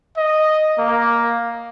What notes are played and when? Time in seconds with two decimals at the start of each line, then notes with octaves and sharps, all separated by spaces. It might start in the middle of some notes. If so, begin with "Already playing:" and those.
0.17 D#5
0.79 A#3